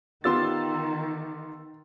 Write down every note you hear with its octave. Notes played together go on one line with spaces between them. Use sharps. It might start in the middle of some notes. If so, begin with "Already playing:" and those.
D#3 B3 F4 G4 C6 E6 A6